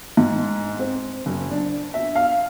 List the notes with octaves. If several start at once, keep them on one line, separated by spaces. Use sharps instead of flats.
G#2
C4
F#1
D4
E5
F5